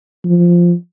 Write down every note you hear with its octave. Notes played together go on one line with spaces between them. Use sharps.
F3